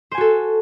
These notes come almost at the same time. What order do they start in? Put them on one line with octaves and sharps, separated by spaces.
C5 G#5 F#4 A4